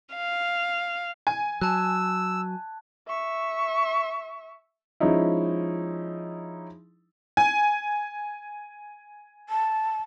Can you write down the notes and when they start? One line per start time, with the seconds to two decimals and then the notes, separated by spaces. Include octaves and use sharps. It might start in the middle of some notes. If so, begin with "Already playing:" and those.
0.15 F5
1.27 G#5 G#6
1.61 F#3 A5 E6 F#6
3.08 E5 C#6
5.00 F3 G#3 C#4 D#4 E4
7.37 G#5
9.49 A5